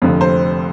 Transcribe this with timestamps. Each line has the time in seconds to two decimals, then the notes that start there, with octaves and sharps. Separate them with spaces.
0.02 F1 F2 D3 F3
0.21 C5